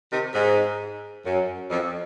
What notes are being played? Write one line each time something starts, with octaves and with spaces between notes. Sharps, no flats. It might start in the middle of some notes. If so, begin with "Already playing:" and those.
C3 D#3
G#2
F#2
F2